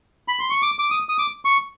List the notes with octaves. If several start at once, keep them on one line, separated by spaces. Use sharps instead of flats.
B5
C6
C#6
D6
D6
D#6
D#6
D6
C#6